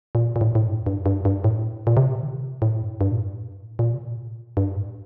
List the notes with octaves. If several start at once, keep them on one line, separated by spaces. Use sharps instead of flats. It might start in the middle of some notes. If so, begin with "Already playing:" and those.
A#2
A#2
A2
A2
G2
G2
G2
G2
A2
A#2
C3
D#3
C3
A2
G2
G2
A#2
A2
G2
A2
A#2
C3
A#2
A2
G2
A2